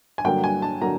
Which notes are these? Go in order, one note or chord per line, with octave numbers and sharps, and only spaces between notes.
G#5
G2 D3 F#3 A#3 G5
G#5
A5
D3 F#3 A#3 A#5